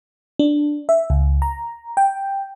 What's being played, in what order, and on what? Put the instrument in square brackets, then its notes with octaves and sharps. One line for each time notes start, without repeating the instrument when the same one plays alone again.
[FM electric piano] D4
E5
C#2
A#5
G5